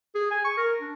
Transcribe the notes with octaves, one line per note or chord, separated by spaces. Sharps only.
G#4
G#5
C#6
A#4
D4